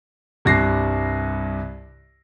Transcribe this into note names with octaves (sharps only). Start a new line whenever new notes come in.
C2 G2 A#6 C7